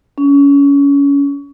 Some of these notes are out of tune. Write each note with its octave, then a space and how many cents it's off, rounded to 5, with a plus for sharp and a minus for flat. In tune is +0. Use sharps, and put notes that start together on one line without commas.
C#4 +25